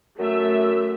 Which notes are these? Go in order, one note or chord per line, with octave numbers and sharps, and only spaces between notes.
F#2 A3 E5